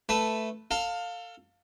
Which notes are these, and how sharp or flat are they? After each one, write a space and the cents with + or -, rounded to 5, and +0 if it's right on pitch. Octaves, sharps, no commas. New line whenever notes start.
A3 +0 B4 +0
A4 +30 F5 +15